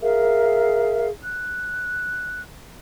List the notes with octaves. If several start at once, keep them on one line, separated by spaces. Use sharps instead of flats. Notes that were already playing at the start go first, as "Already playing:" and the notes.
G#4 A#4 E5 F5
F#6